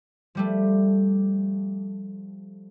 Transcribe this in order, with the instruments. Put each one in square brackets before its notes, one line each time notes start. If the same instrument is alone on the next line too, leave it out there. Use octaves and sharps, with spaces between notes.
[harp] F3 G3 A3